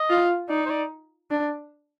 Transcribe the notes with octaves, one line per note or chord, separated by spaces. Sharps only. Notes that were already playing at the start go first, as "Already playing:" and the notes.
Already playing: D#5
F4
D#4 D5
C5
D5
D4